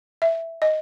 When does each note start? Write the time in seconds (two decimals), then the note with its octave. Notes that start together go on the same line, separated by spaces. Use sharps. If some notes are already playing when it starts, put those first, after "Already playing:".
0.22 E5
0.62 D#5